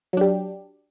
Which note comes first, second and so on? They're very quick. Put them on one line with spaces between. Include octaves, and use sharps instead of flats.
F#3 D4 G4